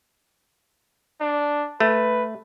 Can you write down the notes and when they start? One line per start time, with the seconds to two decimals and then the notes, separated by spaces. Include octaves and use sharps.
1.21 D4
1.80 A3 B4